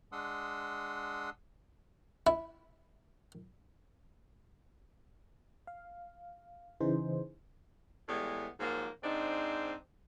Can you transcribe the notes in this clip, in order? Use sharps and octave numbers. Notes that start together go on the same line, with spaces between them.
G#3 D4 F#5 C6 D#6 E6
E4
F5
C#3 E3 D#4 G#4 C5
A2 E3 G3 G#3 B3
G#2 F3 F#3 A#3
G#2 C4 D4 D#4